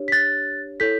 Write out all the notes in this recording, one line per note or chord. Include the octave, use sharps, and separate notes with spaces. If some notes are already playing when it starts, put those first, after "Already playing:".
Already playing: D4 G4 C#5
B6
F#6 A6
E4 A4 C#5 G6 B6